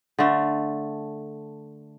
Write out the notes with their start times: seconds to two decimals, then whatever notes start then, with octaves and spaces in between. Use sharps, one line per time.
0.19 D3 A3